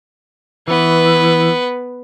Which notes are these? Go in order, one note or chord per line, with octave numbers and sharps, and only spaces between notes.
E3 B3 B4